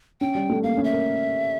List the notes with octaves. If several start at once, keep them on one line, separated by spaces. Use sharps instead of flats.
C#4 G5
G3
A3
A#3 F5
C#4
E5
A#4